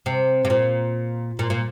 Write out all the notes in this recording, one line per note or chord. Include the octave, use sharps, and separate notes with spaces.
C3
C3
A#2
A#2
A#2